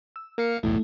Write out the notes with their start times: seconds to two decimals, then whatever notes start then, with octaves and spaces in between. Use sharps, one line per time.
0.16 E6
0.38 A#3 A#4 F5 C#7
0.63 B1 E2 A2 A3 E4